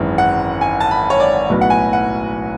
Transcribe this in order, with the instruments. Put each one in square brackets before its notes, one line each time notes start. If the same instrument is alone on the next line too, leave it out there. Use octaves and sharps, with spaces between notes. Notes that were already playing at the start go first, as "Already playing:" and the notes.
Already playing: [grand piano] G#1 F#2 E3 G#3 C#4
F#5
G#5
A5
B5
C#5
D5
B1 A2 F#3 B3
F#5
G#5
F#5